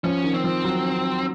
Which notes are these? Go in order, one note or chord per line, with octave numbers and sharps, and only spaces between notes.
F3 C#4
D#3
C4
F3
F#3